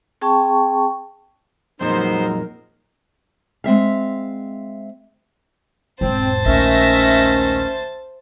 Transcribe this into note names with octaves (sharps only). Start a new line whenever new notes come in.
C4 G#4 G5 A5 C#6
F2 A#2 F#3 G#3 B3 D#4 A#4 C5
G#3 C4 E5 F5
E1 G#2 C4 C5 A5
A#1 D#2 D#3 A3 C#4 E5 A#6